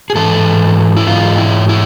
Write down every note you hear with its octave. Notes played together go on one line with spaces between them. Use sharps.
G#4
G#2 E3 A4
E4
G#2 E3 F4
E4
E4